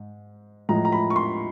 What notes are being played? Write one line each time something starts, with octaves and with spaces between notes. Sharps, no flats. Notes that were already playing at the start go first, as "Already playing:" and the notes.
Already playing: G#2
A2 F3 G#3 A#5
A#5
B5
C#6
C6